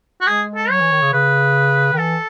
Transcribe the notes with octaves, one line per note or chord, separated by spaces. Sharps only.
F#4
G#3 G#4
A4
F#3 C#5
E3
D#3
C#3
C#3 B4
D#3
E3 A4